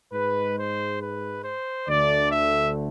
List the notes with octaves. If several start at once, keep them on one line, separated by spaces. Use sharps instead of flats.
G#2 G#3 B4
C5
B4
C5
D2 D3 A3 D5
E5